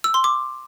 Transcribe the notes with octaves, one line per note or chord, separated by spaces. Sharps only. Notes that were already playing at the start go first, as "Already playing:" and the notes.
E6
C6
D6